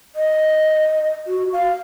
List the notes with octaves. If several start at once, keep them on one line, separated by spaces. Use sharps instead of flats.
D#5
F#4
F5